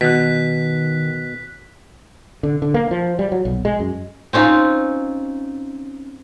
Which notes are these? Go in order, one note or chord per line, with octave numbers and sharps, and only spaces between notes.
B2 D#3 F#6 B6
D3
D3
A#3
F3
G3
F#3
B1
G#3
F#2
C4 C#4 D#4 F4